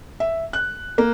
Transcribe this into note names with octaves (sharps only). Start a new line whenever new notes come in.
E5
F#6
A#3